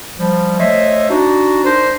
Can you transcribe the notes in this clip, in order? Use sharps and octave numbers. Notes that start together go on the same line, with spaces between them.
F3 G3
A3 C5 C#5 D#5 E5
D4 D#4 F#4
D4 D#4 A#4 C5